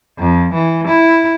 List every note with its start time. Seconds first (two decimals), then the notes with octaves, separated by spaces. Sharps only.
0.19 F2
0.54 E3
0.88 E4